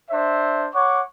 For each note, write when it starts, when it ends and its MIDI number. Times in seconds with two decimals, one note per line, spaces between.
0.10 0.68 62
0.10 0.68 72
0.10 0.68 76
0.74 1.02 73
0.74 1.02 78
0.74 1.02 85
0.74 1.02 86